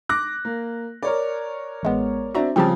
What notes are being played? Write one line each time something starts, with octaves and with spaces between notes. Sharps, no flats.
D6 F#6 A#6
A#3
A#4 C#5 D5
A1 G#3 B3
C4 D4 F#4 E5 A#5
C#3 F3 G3 C4 G4 A5